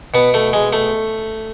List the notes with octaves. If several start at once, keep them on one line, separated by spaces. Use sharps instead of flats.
B2 B3
A3
G#3
A3